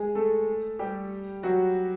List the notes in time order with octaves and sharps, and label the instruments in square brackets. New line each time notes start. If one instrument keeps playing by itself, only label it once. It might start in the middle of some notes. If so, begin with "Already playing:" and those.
Already playing: [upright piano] G#3 G#4
A3 A4
G3 G4
F#3 F#4